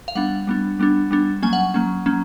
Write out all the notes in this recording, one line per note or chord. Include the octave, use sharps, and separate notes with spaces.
F5
G3 B3 D4 F#5
G3 B3 D4
G3 B3 D4
G3 B3 D4
F#3 A#3 C#4 G#5
F#5
F#3 A#3 C#4
F#3 A#3 C#4